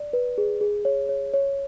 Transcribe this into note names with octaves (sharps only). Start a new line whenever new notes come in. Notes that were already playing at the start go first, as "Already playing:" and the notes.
Already playing: D5
B4
G#4
G#4
C#5
C#5
C#5